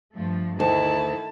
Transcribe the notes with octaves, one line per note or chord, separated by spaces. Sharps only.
G2 F3 A3
D2 D#3 E4 A5